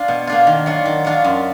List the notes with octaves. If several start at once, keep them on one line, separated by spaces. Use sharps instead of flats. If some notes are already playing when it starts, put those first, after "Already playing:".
Already playing: D4 F4
B2
A#3 D4 F4
D#3
F#3 D4 F4
D#3
F#3 D4 F4
F#2